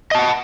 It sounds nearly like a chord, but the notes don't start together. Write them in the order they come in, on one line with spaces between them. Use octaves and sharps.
D#5 A5 F#5